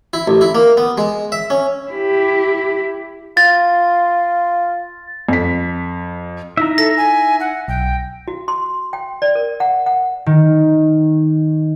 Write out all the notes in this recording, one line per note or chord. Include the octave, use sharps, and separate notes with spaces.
E4
A1
E4
A#3
B3
G#3
E5
C#4
E4 G4
F4 A6
F2 B6
D#4 E4 E5 A#5
A4 A#6
G#5
F#5
B1 G5
F#4
C6
G5
D5
A#4
F#5
F#5
D#3